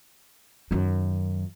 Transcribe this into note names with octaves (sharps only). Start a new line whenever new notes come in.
F#2 D#3